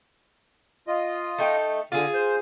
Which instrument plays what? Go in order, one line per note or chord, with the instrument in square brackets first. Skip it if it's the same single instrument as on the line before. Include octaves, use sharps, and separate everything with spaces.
[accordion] F4 D#5
[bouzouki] A3 D#4 G5
[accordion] D3 [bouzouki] F4 G#4
[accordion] C5 G6